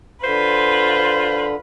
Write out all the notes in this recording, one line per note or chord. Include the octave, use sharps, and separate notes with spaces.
D3 F4 B4 C5